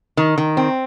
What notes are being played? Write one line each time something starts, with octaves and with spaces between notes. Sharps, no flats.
D#3
D#3
C4